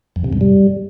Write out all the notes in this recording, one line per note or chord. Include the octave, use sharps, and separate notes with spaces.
F2
C3
G2
G3